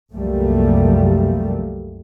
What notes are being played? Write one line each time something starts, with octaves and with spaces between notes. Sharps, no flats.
C2 F#2 F3 G3 A3 A#3